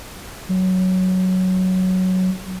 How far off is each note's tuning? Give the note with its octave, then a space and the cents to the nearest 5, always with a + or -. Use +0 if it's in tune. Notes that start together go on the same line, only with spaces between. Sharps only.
F#3 +5